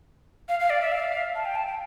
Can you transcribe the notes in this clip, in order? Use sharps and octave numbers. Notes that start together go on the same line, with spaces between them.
F5
F5
D5
E5
F5
A5
G5
A5
G5